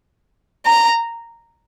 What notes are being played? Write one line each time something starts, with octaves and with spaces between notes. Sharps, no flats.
A#5